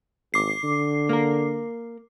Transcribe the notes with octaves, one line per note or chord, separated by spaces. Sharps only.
G#1 D6 C7
D3
A#3 A#4